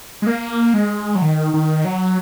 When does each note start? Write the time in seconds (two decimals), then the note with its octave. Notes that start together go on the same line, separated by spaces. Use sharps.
0.22 G#3
0.27 A#3
0.74 G#3
1.15 F#3
1.22 D#3
1.54 D#3
1.85 F#3